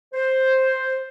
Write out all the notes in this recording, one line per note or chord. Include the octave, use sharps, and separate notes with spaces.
C5